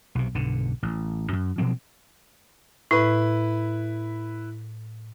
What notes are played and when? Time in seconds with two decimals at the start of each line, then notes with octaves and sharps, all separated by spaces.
0.15 B1 C3
0.35 B1 G2 D3
0.83 A1
1.33 F#2
1.58 B2 F3 F#3 C4
2.91 A2 E4 B4